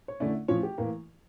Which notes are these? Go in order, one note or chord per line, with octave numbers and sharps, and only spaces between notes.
C#5
D3 A3 C#4 E4 D5
A2 F3 C#4 F4 C#5
G4
A2 E3 A#3